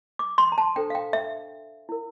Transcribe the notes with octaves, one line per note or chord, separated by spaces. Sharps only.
D6
C6
A#5
A5
D4 A4 C5 G5
F5
G5
E5
E4 A#4